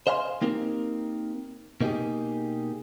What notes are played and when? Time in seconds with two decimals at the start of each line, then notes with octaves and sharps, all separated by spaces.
0.07 C5 D#5 F5 G#5 B5 C6
0.42 A#3 C4 D#4 G4 A#4
1.81 B2 A#3 D#4 F4 G4 G#4